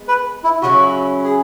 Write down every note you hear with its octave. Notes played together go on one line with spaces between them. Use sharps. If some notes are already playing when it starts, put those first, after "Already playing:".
Already playing: G#3 B3
B4
E4
C#3 F#3 C#4 E4 F#4
G#4